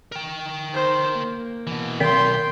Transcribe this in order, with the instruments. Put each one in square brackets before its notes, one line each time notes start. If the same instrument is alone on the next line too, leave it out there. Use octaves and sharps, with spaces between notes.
[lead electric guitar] A#4 G5
[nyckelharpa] D#4 C5
A#3
[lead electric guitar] B2 E3
[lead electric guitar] B1 [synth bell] D#3 A#4 B6 [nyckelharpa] G5 C6